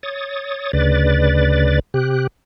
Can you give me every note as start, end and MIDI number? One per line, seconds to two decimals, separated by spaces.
0.03 0.72 73
0.03 0.72 87
0.03 0.72 93
0.73 1.79 38
0.73 1.79 49
0.73 1.79 71
0.73 1.79 74
0.73 1.79 93
1.94 2.27 48
1.94 2.27 67
1.94 2.27 90